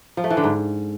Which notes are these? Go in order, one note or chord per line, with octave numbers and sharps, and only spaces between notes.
F3
A3
E3
D3
G#2